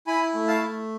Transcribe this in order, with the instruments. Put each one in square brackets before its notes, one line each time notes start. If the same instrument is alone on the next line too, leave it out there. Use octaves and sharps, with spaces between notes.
[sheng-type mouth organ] E4 G#5 B5
A3
F5 A5
A3